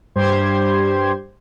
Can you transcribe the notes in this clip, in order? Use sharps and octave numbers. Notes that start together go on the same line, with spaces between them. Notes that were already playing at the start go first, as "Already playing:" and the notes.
G2 G3 G4 C5 C6 G#6